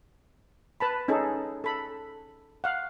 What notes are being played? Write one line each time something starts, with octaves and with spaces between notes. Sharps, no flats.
B4 A5 B5
C#4 D#4 G#4 A4
A4 B5
F5 F#5